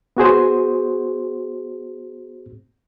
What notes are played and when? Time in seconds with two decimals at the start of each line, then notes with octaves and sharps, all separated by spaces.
0.17 B3 F#4 G#4 C5